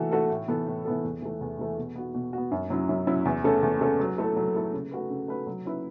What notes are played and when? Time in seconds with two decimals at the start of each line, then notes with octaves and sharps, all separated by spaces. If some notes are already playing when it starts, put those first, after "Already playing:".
Already playing: E3 A3 F#4 A4
0.12 A3 F#4 A4
0.30 A2
0.48 E3 B3 A4
0.67 A2
0.85 E3 B3 A4
1.04 E2
1.22 E3 A3
1.41 E2
1.59 E3 A3
1.78 B2
1.96 B3 F#4
2.14 B2
2.33 B3 F#4
2.51 F#2
2.70 F#3 C#4 E4
2.89 F#2
3.07 F#3 C#4 E4
3.25 E2
3.44 C#3 A3 C#4 A4
3.63 E2
3.81 C#3 A3 C#4 A4
4.00 F#3
4.18 A3 E4 A4
4.36 F#3
4.55 A3 E4 A4
4.73 C#3
4.91 A3 F#4 B4
5.10 C#3
5.28 A3 F#4 B4
5.47 F#3
5.66 C#4 E4 B4